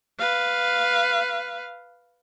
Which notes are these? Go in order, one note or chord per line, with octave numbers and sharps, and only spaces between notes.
B4 F5